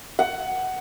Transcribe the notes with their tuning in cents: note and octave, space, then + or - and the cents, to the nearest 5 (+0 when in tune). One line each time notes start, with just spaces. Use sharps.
F#5 +15